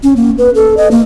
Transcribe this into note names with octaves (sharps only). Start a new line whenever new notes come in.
C#4
A#3
B4
A4
D#5
A#3